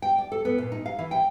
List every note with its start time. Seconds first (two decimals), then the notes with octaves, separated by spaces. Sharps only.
0.02 G5
0.18 D5
0.32 A4
0.45 B3
0.58 A#2
0.72 D#4
0.86 F5
0.99 E3
1.11 G5